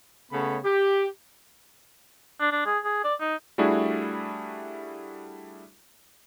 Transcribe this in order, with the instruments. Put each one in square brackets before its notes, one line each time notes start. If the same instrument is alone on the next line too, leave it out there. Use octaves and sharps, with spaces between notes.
[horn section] C#3 A3 B3 A4 C#5 B5
G4
[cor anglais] D4
D4
G#4
G#4
D5
D#4
[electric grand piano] G3 A3 D4 E4 F#4 G#4